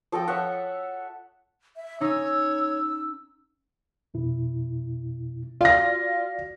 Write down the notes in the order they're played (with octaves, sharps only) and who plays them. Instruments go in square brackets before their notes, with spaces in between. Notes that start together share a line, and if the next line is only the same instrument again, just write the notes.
[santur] F3 A4 D#5 G5
C#5 E5 F#5
[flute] E5
[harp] C#4 D#4 [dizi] C#5 [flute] E6
[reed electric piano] F2 B2 E4
[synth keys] F4 [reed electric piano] F#4 D5 [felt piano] F5 A#6